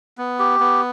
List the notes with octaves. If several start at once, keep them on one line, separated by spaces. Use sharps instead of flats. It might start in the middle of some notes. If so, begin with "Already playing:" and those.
B3
G4
B3